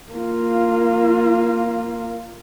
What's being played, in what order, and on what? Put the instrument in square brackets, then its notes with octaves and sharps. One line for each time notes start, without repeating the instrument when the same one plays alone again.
[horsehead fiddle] A#3 F4